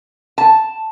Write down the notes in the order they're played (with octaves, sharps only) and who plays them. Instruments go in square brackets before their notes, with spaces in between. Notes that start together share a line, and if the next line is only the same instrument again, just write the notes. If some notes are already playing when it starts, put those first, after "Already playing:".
[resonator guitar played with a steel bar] A5